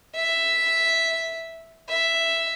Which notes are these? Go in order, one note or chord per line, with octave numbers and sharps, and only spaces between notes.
E5
E5